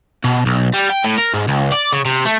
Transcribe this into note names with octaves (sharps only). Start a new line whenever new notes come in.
B2
B1
G3
G5
A2
A#4
G#2
C#2
D5
C#3
C3
A3